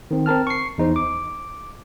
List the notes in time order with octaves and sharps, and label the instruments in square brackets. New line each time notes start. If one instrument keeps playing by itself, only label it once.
[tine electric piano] D#3 C4
C4 A#4 A5 F6
C#6 C7
E2 D#4 C5
D6